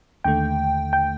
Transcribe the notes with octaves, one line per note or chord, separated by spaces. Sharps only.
D#2 D3 A3 G5
G5